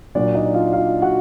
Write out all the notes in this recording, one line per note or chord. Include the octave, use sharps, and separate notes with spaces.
A#2 F#3 D4 D5
D#4 D#5
F4 F5
F4 F5
F#4 F#5